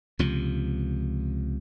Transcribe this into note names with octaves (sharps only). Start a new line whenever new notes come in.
C#2 C3 F3